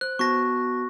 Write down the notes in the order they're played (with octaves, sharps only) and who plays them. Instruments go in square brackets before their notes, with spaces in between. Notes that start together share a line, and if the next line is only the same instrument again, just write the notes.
[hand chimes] C5 [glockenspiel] F#6
[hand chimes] B3 F#4 A5 [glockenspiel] C#6 A#6